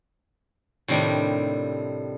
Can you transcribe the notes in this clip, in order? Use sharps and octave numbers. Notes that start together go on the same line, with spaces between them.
A2 C3 D#3 G3 D4